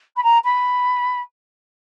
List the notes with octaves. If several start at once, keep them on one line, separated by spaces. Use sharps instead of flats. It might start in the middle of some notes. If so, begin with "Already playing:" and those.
B5
A#5
B5